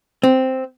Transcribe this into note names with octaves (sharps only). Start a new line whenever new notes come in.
C4